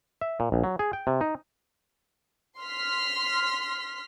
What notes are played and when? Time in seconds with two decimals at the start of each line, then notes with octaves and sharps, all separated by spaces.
0.21 E5
0.40 A#2
0.52 A#1
0.64 F#3
0.79 G#4
0.93 G5
1.07 C3
1.21 D#4
2.59 C6 F6 B6